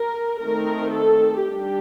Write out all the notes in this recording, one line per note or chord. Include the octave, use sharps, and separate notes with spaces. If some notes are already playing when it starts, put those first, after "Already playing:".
Already playing: A#4
D#3 A3 C4 A#4
A4
G3 D4 G4